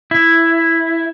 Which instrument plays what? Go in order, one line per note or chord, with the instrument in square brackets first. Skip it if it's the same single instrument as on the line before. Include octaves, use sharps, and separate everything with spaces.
[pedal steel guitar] E4